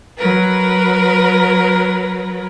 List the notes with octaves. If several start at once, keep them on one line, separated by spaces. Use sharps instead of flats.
F#3 A#4 B4